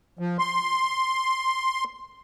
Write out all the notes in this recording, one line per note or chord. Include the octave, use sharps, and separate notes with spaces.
F3
C6